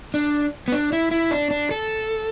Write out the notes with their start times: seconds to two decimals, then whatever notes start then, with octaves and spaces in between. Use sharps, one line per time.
0.14 D4
0.68 B3
0.72 D4
0.93 E4
1.11 E4
1.31 D4
1.51 D4
1.71 A4